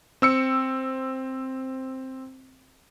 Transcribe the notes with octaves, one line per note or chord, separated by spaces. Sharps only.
C4 E6 C#7